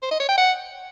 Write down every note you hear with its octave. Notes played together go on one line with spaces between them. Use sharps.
C5
D#5
C#5
G5
F#5